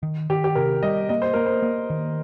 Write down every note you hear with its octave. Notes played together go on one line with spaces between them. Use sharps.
D#3
D#3 G4
G4
C3 A#4
G3 D#5
A#3 D#5
C5
A#3 A#4
C5
A#3
D#3